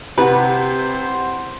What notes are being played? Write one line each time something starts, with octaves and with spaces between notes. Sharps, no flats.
C3 E4 B4 C5 F#5